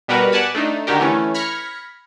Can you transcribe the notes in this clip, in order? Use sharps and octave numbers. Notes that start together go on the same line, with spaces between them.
B2 G3 B3 F#4 A#4 B4
D5 F#5 G#5 A5 B5
A3 D4 D#4
D3 D#3 F#4 G4 A#4
E3 A3 C#4
B5 F6 G#6 A#6 B6 C#7